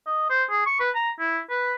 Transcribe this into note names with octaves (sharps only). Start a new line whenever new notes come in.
D#5
C5
G#4
C#6
B4
A#5
E4
B4